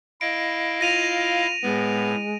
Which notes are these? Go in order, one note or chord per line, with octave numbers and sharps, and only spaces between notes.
E4 D#5 F5 D7
F4 A#6 D#7 F7
A2 G#3 B3